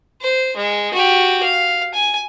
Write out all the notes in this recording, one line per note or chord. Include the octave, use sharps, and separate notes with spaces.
C5
G#3
F#4 G4
F5
G#5